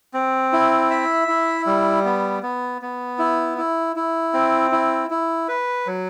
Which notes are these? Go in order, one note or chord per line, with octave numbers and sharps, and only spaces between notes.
C4
E4
E5
E4
G3
B3
B3
B3
E4
E4
E4
C4
E4
E4
B4
F#3